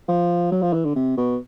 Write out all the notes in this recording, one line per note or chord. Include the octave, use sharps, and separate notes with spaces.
F3
F#3
F3
E3
D3
C3
B2